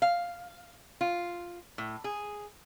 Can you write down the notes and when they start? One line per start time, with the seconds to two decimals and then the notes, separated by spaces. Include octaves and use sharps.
0.02 F5
1.01 F4
1.78 A2
2.04 G#4